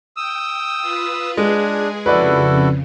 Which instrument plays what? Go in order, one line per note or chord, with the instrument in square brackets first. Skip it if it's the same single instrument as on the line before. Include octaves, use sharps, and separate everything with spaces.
[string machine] G5 [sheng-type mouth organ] D#6 E6
[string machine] F4 B4
[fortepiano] G#3 [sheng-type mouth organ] D4 [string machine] G#4
[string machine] F2 C#3 [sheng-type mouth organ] E4 F#4 A4 [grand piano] B4 D5